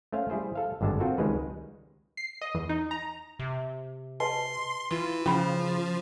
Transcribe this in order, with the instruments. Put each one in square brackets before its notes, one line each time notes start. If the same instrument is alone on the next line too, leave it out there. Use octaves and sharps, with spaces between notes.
[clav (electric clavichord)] A3 C#4 C5 F5
G3 E4 G#4 C5
A4 F5
G#1 G2 D3 G#3 A5
C4 F4 F#4 A4 A#4
C#2 D#3 G3 G#3 G#4 B4
[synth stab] C7
D#5
E2
D#4
A#5
[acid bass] C3
[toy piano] B4 D#5 A5 [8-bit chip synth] C6
[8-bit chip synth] E3 [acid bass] F4
[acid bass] C#3 [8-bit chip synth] F3 [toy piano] C#4 B5